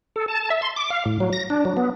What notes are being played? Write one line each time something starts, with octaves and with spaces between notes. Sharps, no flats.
A4
A5
E5
C6
D6
F5
A2
F#3
A#6
D4
F#3
B3